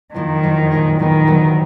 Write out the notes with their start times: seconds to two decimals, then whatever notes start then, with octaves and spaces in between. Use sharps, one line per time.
0.14 F#1 F2 D#3 F3 A#3
0.43 F#1 F2 F3
0.71 A#2 G#3 D#4 G#4
0.99 A#2 D#3 G#3 B3
1.27 D2 D3 F#3 B3